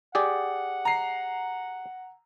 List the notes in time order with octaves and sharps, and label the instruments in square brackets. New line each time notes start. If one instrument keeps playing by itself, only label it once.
[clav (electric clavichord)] G4 G#4 D5 [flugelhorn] F#5
[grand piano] A#5 C7